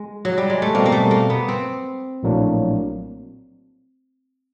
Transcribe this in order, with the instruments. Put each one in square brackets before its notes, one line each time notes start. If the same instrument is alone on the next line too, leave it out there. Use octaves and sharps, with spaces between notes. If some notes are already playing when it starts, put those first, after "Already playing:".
Already playing: [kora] G#3
F#3
G3
G#3
A3
[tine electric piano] B2 G3 C4 [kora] A#3
[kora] A#3
A3
A#3
B3
C4
[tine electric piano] A#1 A2 F#3 A#3 D4